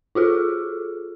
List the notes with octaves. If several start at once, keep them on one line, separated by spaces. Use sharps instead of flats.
F4 F#4 G#4 A4